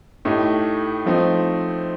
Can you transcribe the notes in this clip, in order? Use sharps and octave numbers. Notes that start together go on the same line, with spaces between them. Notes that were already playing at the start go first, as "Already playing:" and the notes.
A2 A3 D#4 G4
F3 A3 C4 D#4